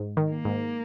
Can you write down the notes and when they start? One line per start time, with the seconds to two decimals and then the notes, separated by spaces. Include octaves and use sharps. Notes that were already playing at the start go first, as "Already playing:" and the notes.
Already playing: G#2
0.17 D#3
0.31 A#3
0.45 G#2